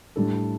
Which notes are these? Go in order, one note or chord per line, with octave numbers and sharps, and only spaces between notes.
A2 G3 D4 A4